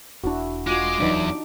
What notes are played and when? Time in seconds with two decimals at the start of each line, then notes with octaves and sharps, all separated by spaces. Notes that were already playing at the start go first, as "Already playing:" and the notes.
0.24 E1 D4 E4 F#4
0.67 G#3 F4 F#4 D6
1.00 D1 E2 E3 F#3 D4 D#4